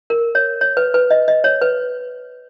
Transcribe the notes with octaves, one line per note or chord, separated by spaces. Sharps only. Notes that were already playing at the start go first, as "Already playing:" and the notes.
A#4
C#5
C#5
B4
B4
D#5
D#5
C#5
B4